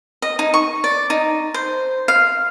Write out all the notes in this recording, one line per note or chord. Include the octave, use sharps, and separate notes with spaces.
D#5
D#4
C#6
D5
D#4
C5
F5